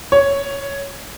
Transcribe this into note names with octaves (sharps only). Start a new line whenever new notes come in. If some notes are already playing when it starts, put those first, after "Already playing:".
C#5